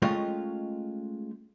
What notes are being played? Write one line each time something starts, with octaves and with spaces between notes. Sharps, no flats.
G#3 A3 C#4 F4 D#5 G5